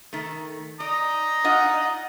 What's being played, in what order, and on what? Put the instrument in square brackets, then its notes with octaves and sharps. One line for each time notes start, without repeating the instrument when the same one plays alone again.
[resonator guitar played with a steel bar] D#3 A3
[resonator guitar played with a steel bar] D5 [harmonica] A#5 D#6
[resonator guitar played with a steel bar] D4 F4 D#5 [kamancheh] F#5